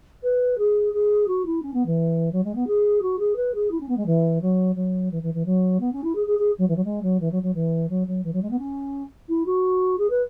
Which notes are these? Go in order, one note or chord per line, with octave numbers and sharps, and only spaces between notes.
B4
G#4
G#4
F#4
E4
C#4
B3
E3
F#3
G#3
B3
G#4
F#4
G#4
B4
G#4
E4
C#4
B3
G#3
E3
F#3
F#3
E3
E3
E3
F#3
B3
C#4
E4
G#4
G#4
G#4
F#3
E3
F#3
G#3
F#3
E3
F#3
F#3
E3
F#3
F#3
E3
F#3
G#3
B3
C#4
E4
F#4
G#4
B4